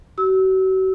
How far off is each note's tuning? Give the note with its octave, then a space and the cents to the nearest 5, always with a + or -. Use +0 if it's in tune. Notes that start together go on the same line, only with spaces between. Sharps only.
F#4 +35 E6 -30